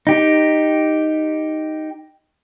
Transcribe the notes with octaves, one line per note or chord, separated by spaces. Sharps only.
D#4 G4